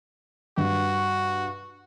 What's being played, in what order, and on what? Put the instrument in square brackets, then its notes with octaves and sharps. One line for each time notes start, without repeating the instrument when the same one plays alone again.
[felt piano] G2 [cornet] F#4